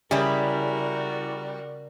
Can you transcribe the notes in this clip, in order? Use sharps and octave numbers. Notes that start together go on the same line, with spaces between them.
C#3 G3 E4 F#4 G#4 A#4